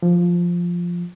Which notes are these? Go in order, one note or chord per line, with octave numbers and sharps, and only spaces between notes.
F3